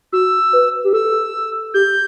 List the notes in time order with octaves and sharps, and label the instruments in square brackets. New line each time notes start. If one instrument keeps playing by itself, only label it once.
[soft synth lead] F#4 [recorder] E6
[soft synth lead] B4
G4
[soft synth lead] A4 [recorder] E6
[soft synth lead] G4 [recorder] G6